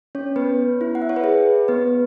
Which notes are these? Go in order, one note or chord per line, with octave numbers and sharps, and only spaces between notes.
C#4 C#5
B3 B4
E4
F#5
E5
C#5
B4
G#4
B3 B4